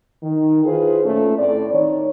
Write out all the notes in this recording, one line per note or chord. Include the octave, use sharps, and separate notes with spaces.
D#3
E4 F4 G#4 B4 C5
A#2 A3 C#4 A4
A2 C4 E4 D5
D#3 C#5